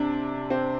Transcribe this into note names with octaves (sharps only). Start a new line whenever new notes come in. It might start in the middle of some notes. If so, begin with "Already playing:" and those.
Already playing: C3 D4
C4